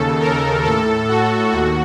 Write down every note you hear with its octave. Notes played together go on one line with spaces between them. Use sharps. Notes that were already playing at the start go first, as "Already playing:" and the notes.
Already playing: D#2 C#3 A4
A#4
A2 A4
F#4
D#2 F#4